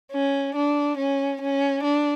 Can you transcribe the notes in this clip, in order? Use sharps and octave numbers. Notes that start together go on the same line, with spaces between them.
C#4
D4
C#4
C#4
D4